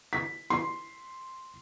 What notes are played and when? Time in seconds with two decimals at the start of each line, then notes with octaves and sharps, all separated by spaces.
0.13 B6
0.50 C6